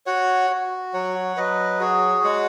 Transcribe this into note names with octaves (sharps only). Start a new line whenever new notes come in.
F#4 C#5 F#5
F#4
F#3 C#5 F#5
F#3 B4 D#5
F#4 G#4 C#5
G#3 C#5 F#5